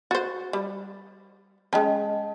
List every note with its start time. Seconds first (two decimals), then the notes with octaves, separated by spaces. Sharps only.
0.11 F#4 C5 A6
0.53 G3
1.73 G#3 C#4 D#5 G5 A5